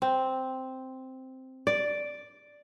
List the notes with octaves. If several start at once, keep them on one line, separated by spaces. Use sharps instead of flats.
C4
D5